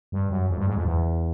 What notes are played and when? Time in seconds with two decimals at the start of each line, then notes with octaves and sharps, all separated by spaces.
0.12 G2
0.30 F#2
0.49 F2
0.58 G2
0.67 G#2
0.75 F2
0.85 E2